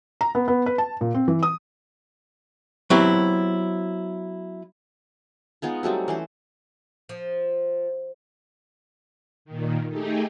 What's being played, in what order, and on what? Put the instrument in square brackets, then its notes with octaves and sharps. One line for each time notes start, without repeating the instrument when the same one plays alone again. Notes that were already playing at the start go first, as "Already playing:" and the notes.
[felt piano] A#5
B3
B3
B4
A5
A#2
C4
E3
D#6
[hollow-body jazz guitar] F#3 B3 C4 E4 G4
[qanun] G#3 B3 D#4 F4
F#3 G3 A3 C4
E3 C#4 C5
[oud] F3
[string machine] A#2 D#3
A3 D#4 G4 G#4